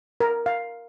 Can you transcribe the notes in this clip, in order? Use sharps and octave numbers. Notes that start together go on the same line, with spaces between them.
A#4
F5